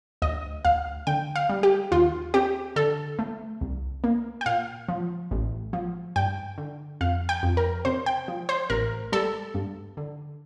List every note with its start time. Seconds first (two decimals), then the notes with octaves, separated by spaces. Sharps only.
0.22 D2 D#5
0.65 D2 F5
1.07 D3 G5
1.36 F5
1.49 G3
1.63 G4
1.91 D#2 F4
2.34 C4 G4
2.76 D3 A4
3.19 A3
3.61 C2
4.04 A#3
4.41 G5
4.46 A#2 F5
4.88 F3
5.31 A1
5.73 F3
6.16 G2 G5
6.58 D3
7.01 F2 F5
7.29 G5
7.43 F2
7.57 A#4
7.85 C3 C5
8.06 G5
8.28 F3
8.49 C5
8.70 A1 A#4
9.12 G3 A4
9.55 G2
9.97 D3